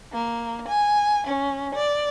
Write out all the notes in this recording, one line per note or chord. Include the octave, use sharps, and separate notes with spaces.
A#3
G#5
C#4
D5